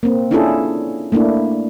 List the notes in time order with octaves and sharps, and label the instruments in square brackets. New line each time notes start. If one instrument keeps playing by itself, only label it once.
[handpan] A#3 C4
C#4 D4 E4 F4 G#4 A4
A3 A#3 D4 E4